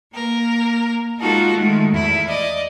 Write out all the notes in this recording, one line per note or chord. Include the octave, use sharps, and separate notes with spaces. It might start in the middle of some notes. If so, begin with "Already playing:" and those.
A#3 A#4
G#3 D#4 F4 F#4 A4 A#4
D#3 G#3 A3
E2 E4
D5 D#5